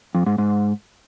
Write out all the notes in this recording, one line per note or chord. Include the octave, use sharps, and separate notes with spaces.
F2
G#2
G#2